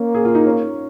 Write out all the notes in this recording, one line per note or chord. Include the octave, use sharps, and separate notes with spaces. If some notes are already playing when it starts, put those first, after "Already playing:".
Already playing: A#3 C#4
G#4
F4
D#4
C#4